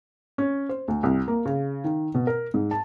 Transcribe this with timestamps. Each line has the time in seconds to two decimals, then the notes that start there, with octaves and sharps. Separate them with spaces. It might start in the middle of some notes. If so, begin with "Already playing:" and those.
0.38 C#4
0.69 C5
0.88 D2
1.03 C2
1.28 A#3
1.45 C#3
1.84 D#3
2.14 B2
2.27 A#4
2.54 G#2
2.71 A5